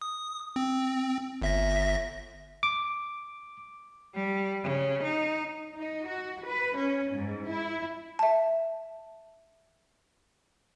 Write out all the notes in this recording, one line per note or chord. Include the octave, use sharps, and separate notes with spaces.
D#6
C4
G1 E5 A#6
D6
G3
C#3
D#4
D#4
F#4
B4
C#4
G#2
E4
E5 A5